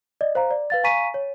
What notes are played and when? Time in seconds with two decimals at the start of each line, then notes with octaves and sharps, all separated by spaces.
0.21 D5 D#5
0.35 C5 F5 A#5
0.51 D5
0.70 B4 F5 A6
0.84 F5 G#5 A#5 C#6 B6 D#7
1.14 C#5